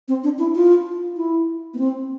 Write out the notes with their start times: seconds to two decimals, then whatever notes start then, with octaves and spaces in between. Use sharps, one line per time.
0.08 C4
0.24 D4
0.39 E4
0.55 F4
1.17 E4
1.74 B3
1.78 C4